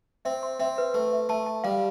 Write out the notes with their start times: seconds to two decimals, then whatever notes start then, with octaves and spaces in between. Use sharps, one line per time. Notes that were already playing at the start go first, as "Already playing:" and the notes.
0.25 C4 E5
0.43 C6
0.60 C4 E5
0.78 B4
0.94 A3 B4
1.13 E5
1.29 A3 A5
1.46 A5
1.64 G3 F5